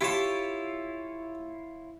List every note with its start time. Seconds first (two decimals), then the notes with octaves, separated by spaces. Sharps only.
0.01 E4 F4 G4 C#5 A5